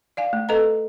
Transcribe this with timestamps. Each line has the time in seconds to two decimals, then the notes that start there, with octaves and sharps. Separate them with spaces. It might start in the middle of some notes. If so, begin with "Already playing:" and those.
0.17 D5 F5 G#5
0.33 A3
0.49 A4 B4 D#5 A#5